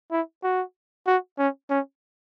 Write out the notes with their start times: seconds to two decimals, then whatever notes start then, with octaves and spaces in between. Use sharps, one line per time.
0.11 E4
0.43 F#4
1.07 F#4
1.38 C#4
1.70 C#4